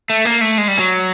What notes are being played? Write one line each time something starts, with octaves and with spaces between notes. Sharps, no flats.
A3
A#3
A3
G#3
G3
F#3